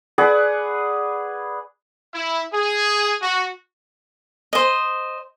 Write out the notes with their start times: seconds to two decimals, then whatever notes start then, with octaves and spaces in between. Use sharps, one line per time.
0.18 G#4 B4 D5 F#5
2.14 E4
2.54 G#4
3.22 F#4
4.53 C5 D#5